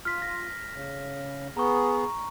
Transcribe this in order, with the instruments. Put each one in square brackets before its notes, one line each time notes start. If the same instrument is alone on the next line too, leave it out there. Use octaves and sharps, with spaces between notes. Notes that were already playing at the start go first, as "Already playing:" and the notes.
[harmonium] F4 [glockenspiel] F6 B6
[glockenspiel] A#6
[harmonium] C#3
[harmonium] B3 G#4 [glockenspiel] A#5 C#6